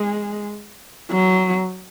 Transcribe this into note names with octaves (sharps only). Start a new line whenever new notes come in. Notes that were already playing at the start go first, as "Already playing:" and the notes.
Already playing: G#3
F#3